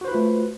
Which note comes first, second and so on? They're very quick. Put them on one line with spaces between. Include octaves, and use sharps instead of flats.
F#4 C5 B4 F4 A3